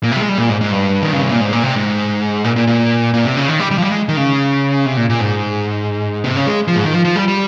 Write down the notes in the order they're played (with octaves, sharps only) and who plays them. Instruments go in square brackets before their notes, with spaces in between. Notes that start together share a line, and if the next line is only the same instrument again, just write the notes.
[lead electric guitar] A#2
C3
G3
G#3
G3
A#2
G#2
G#2
G2
D#3
C#3
C3
A#2
G#2
A#2
C3
G#2
A#2
A#2
A#2
A#2
C3
C#3
D#3
G3
G3
F3
G3
G#3
D#3
C#3
C3
A#2
A#2
G#2
C3
C#3
G#3
F3
G#2
D#3
F3
F3
G3
G3